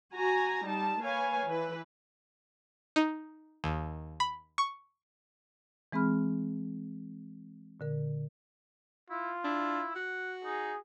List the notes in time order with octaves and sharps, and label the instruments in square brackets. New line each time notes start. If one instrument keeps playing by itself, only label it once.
[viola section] F#4 G#5 A#5
G3 D#4 A5
A#3 B4 C#5 F5 G#5
E3 B4
[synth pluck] D#4
D#2
B5
C#6
[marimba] E3 G#3 C4 G#4 B5 F6
A#2 D3 A#4
[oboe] E4 [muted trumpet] F4
[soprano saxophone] D4 [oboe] E4
[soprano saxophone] F#4 [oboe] F#5
[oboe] D#4 [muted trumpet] G#4